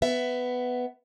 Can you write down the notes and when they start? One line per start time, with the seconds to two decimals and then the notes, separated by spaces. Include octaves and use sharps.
0.02 B3 E5